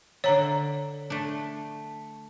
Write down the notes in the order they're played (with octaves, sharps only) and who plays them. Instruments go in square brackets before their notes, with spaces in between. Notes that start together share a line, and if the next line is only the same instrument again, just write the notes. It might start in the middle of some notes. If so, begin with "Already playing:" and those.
[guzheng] D3 E5 [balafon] C#5 A#5
[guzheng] A3 D4